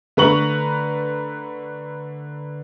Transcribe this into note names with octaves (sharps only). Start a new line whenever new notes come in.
D3 A3 B4 A#5 C#6 F#7